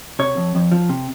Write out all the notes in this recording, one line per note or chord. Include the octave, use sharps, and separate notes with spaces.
C3 C#5
F2
F2
F3
C3